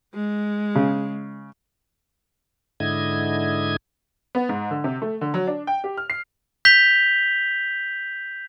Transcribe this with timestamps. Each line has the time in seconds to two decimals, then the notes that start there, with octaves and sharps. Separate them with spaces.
0.14 G#3
0.75 C#3
2.80 G#2 D3 E4 D#5 G#6
4.35 B3
4.49 G#2
4.71 D3
4.84 C3
5.02 A3
5.21 D3
5.34 F#3
5.47 D4
5.67 G5
5.84 G4
5.97 F6
6.10 C7
6.65 G6 B6 F7 G7